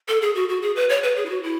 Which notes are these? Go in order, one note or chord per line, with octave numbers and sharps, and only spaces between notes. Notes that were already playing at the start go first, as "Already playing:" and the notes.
A4
G#4
F#4
F#4
G#4
B4
C#5
B4
G#4
E4
F#4
E4